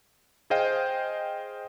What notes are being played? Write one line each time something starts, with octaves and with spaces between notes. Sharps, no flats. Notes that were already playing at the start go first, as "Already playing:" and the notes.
G#4 C5 D#5 F5 G5